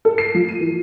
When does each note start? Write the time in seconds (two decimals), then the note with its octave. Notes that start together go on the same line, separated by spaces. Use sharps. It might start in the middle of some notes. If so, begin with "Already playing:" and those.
0.05 A4
0.18 C7
0.35 F3
0.49 D#7
0.61 E3